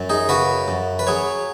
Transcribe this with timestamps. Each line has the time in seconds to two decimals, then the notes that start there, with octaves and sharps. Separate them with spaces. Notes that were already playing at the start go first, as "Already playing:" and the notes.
Already playing: F#2 F#3
0.09 D#4 G#4
0.29 C#3 F#4 B4
0.68 F#2
0.99 B4
1.07 F#3 G#4 C#5